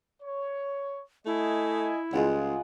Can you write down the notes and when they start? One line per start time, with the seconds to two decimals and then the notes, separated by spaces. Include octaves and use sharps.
0.22 C#5
1.26 A3 E4 D#5 G#5
2.13 C#2 G3 G#3 F4 G#4 F#5